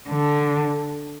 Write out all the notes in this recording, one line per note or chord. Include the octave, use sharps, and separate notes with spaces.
D3